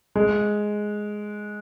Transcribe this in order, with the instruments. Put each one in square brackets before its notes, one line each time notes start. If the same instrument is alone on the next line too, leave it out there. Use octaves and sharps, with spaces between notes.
[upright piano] G#3